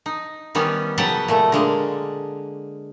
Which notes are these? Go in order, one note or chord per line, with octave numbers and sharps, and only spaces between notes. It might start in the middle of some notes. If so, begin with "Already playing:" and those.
D#4
D#3 G3 B3 C#4
C#3 F#3 B4 F#5 G5 A5
A#2 A3
D3 G#3 A#3